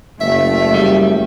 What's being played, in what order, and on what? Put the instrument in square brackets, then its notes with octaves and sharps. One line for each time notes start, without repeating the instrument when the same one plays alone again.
[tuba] F#1 [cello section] A3 [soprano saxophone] E5
[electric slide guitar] G3